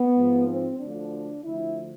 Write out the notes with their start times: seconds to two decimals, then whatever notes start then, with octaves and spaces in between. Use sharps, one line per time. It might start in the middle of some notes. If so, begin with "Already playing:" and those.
Already playing: B3
0.16 G#2 F3
0.48 C4
0.80 D2 D3 F3 D4
1.43 D2 D3 F3 E4